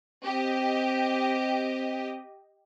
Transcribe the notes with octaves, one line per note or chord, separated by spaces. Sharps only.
C4 G4 D#5